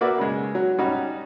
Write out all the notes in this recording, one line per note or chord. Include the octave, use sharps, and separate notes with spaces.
A#3 F#4 B4 D5 E5
C#3 G#3
F#3
G3 C#4 D#4 F#4